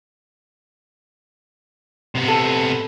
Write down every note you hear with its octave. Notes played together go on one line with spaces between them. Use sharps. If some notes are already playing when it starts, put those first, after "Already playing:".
C3 B3
A4